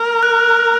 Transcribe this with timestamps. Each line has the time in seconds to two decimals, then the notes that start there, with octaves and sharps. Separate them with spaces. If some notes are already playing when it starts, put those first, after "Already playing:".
Already playing: A#4
0.23 F#6